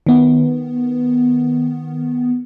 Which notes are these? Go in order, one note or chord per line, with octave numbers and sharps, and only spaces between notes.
D#3 B3